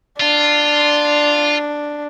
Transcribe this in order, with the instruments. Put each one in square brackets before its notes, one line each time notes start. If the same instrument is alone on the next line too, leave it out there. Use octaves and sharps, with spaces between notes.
[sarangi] D4 [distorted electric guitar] F4